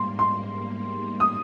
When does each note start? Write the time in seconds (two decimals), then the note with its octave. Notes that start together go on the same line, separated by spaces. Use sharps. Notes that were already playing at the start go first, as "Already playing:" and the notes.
Already playing: G#2 G3 A#3 C6
0.19 C6
1.20 D#6